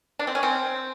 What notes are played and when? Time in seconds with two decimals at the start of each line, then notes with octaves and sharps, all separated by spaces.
0.19 D4
0.27 C4
0.35 C#4
0.43 C4